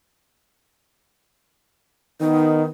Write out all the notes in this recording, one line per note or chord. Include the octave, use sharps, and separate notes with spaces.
D#3 B3 D#4